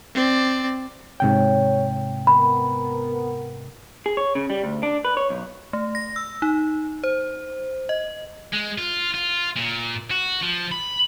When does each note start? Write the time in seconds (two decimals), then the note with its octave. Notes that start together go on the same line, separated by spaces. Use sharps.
0.14 C4 D5
1.20 G#2 C3 C#5 G5
2.27 B3 A#4 B5
4.06 G#4
4.17 C#5
4.35 C#3
4.50 G3
4.64 D2
4.83 D4
5.05 B4
5.17 C#5
5.30 B1
5.73 A3
5.95 A#6
6.16 E6
6.42 D#4
7.04 C5
7.89 D#5
8.53 G#3
8.78 F4
9.14 F4
9.56 A#2
10.11 F#4
10.43 F3
10.72 B5